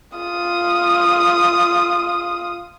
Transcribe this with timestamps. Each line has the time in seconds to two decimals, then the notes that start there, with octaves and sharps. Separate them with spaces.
0.18 F4 D#6